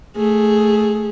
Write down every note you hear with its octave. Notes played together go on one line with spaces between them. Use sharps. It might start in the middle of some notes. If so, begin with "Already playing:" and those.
A3 G#4